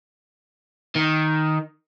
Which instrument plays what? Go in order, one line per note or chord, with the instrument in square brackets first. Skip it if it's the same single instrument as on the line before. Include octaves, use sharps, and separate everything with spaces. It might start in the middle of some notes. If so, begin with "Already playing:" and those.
[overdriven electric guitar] D#3